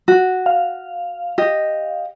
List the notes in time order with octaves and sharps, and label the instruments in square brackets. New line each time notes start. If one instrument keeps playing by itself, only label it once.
[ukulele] F#4
[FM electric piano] F5
[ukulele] G4 D#5